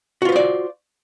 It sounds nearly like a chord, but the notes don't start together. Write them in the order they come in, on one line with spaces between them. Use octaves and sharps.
F#4 F4 B4 C5 D5